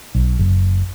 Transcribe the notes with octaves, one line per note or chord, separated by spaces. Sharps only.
B1
F#1